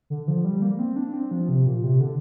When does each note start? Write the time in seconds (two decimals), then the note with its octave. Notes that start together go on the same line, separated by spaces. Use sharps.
0.10 D3
0.28 F3
0.45 G3
0.62 A#3
0.79 C4
0.96 D4
1.14 C4
1.31 F3
1.49 C3
1.66 A#2
1.84 C3
2.00 D3